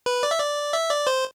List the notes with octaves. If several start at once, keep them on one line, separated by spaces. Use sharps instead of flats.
B4
D5
E5
D5
E5
D5
C5